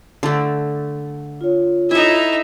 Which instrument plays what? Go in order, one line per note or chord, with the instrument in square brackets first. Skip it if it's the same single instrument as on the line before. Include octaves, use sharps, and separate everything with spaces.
[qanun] D3 A3
[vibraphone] F4 C#5
[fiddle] D#4 E5 [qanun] E4 A4